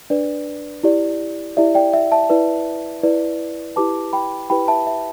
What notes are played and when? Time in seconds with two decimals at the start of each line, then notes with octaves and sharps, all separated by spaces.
0.10 D4 B4 D5
0.83 E4 G4 D5
1.57 E4 G4 D5 E5
1.75 D5 G5
1.93 E5
2.12 E5 A5
2.30 E4 B4 D5
3.03 E4 B4 D5
3.76 E4 G4 B4 A5 D6
4.13 G5 B5
4.50 E4 G4 B4 G5 B5
4.68 E5 A5
4.87 E5